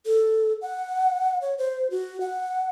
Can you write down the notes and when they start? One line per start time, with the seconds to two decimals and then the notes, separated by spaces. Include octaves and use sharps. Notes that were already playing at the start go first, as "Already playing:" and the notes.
0.06 A4
0.62 F#5
1.41 C#5
1.58 C5
1.91 F#4
2.21 F#5